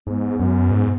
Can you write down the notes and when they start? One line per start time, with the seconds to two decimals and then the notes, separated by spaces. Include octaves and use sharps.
0.07 G#2 B3
0.39 F#2
0.71 G#2